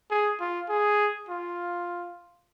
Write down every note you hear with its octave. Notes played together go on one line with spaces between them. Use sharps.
G#4
F4
G#4
F4